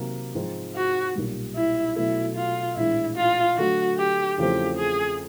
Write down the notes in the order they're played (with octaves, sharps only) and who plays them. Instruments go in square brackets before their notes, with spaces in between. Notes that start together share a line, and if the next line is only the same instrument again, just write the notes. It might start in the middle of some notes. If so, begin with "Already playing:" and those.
Already playing: [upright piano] C3 D#3 F#3 A#3
G#2 F3 G#3 C4 D#4
[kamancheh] F#4
[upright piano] B1 A#2 G3
[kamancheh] E4
[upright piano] B2 F#3 A3 [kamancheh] E4
[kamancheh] F4
[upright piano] A#1 A2 E3 G#3 [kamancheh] E4
[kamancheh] F4
[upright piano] D3 F#3 A3 [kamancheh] F#4
[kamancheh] G4
[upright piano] E2 C#3 F3 A3 C4 [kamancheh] G4
[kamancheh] G#4